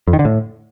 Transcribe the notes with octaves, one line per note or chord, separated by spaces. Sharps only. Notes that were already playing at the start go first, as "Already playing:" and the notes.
F2
D#3
D3
A2